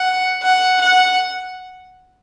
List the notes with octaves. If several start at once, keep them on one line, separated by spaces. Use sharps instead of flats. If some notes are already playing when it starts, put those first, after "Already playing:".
Already playing: F#5
F#5
F#5